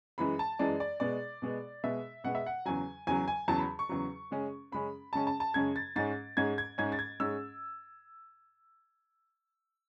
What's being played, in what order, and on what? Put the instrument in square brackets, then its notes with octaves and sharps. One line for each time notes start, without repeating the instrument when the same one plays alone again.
[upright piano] F#2 E3 G#3 B5
A5
F#2 E3 G#3 D5
D5
B2 G#3 B3 D5
B2 G#3 B3
B2 G#3 B3 E5
B2 G#3 B3 F#5
E5
F#5
E2 C#3 F#3 G#5
E2 C#3 F#3 G#5
G#5
E2 C#3 F#3 A5
B5
C#6
E2 C#3 F#3
F#2 C#3 G#3 C#4
F#2 C#3 G#3 C#4 B5
F#2 C#3 G#3 C#4 A5
A5
A5
F#2 C#3 G#3 C#4 G#6
A6
G#2 G#3 C#4 A6
G#2 G#3 C#4 G#6
G#6
G#2 G#3 C#4 G#6
A6
G#6
G#2 G#3 C#4 E6